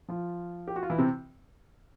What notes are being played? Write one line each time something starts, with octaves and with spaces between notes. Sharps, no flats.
F3 F4
G4
F#4
F4
E3 E4
C3 C4